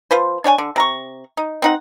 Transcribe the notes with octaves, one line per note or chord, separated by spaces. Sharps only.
F3 F4 B4 C5
D4 C#5 G5 G#5
D3
C3 A#5 C#6
D#4
C4 D#4 F#5